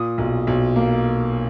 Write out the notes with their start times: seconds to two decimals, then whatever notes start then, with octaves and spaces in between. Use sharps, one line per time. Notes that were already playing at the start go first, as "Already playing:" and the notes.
Already playing: A#2 D#6
0.18 B1
0.47 B1
0.76 A#3